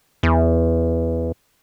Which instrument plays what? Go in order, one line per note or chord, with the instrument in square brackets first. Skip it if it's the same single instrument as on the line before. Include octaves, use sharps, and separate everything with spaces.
[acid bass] E2